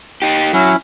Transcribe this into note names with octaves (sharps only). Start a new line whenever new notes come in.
D#4 G4
F#3 C#4 E4